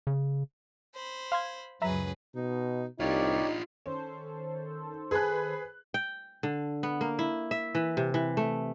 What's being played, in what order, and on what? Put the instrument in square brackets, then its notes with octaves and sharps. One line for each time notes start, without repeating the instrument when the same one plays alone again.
[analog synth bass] C#3
[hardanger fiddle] C5 B5
[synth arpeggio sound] F5 C6 G#6
[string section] C#2 F#2 F#3 [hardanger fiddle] G#4 B4 [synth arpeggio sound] E5 A#5 B5
[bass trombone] B2 [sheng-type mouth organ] D#4
[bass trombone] C2 [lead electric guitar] D4 F4 [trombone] D#4 [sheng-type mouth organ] G4 C#5 D5
[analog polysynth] D#3 A4 C5 [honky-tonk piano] C#4
[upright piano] G#4 [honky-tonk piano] B4 B5 F#6
[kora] G5
D3
B3
A#3
E4
E5
E3
C3
E3
A3